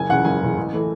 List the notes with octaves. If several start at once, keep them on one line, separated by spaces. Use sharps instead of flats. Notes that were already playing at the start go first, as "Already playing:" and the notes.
Already playing: F#1 G#5
E2 C#3 F#5
F#1 G#5
E2 C#3
A1
E3 A3